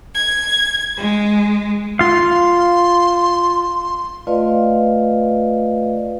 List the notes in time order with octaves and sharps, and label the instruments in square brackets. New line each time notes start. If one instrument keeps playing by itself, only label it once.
[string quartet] G#6
G#3
[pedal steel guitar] F4 F5 [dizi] C6
[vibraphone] A3 F4 B4 D5 D#5 F5